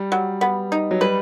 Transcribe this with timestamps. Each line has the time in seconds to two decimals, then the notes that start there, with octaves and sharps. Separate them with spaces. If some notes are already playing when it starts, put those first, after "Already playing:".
Already playing: G3
0.12 F#3
0.41 B3
0.72 D#4
0.91 F#3
1.01 G3 B4